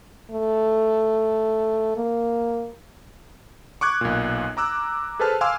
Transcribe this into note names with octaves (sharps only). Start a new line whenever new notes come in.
A3
A#3
C#6 D6 F#6 G#6
B1 A#2
A#5 D6 E6 F#6
G#4 A4 B4 C5 A5 F6
F5 G#5 C6 D6 E6 F6